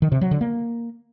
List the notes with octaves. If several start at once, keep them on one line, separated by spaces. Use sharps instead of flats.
D#3
C3
F#3
D3
A#3